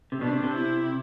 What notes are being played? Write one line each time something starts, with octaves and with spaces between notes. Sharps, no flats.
C3
B2 D4
C3
C3
E4